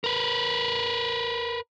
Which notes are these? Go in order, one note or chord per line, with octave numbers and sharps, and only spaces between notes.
A#4 B4